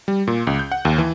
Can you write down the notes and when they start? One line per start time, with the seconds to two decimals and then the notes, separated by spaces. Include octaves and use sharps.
0.08 G3
0.27 A#2
0.47 C#2
0.59 G6
0.72 F#5
0.85 D#2
0.98 E3